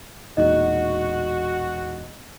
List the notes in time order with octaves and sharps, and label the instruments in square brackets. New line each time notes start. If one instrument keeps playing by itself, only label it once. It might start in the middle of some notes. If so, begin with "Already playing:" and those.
[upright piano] E1 A#2 D#4 [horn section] F#4 [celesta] D#5